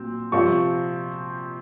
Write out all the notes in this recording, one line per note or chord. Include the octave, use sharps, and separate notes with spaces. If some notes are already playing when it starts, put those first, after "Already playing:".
Already playing: A#2 F#3 C4
C3 F3 C4 F4 C#6